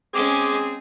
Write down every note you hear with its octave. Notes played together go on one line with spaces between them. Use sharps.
G#3 C4 C#4 G#4 D6